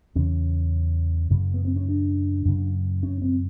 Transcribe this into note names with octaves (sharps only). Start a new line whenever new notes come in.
E2 C#3 C#4
F#2 C#3
B3
C4
C#4
D4
F#2 C#3
C#4
C4